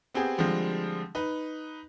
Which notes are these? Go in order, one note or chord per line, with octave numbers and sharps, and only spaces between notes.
B3 C4 G4 G#4
D3 F3 G3 G#3 C4
D#4 B4